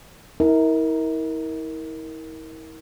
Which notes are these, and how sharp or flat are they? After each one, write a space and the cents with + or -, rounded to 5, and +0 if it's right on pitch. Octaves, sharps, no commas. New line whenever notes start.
E4 -40 A#4 +0